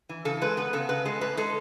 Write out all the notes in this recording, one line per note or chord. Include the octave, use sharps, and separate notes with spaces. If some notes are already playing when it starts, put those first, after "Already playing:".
E3
C#3 A4
G#3 B4
B3 B4
C#3 A4
C#3 B4
G#3 A4
A2 B4
G#3 A4